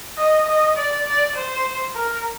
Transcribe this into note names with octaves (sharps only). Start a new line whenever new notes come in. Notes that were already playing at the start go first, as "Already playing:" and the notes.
D#5
D#5
D5
D5
C5
A#4